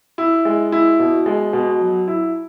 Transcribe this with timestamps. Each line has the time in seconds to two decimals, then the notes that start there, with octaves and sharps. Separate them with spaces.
0.18 E4
0.45 G#3
0.72 E4
0.99 B2
1.26 G#3
1.53 B2
1.80 F#3
2.08 E4